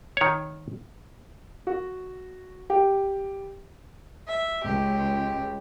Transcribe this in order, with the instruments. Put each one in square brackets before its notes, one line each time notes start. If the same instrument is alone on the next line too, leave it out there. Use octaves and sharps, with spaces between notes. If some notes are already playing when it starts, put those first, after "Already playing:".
[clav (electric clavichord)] D#3 C#5
[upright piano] F#4
G4
[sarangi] E5
[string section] C#2 [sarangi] G4